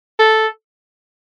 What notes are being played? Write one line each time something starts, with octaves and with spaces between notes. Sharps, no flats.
A4